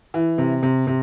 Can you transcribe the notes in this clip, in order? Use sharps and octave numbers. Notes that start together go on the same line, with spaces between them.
E3
C3
C3
C3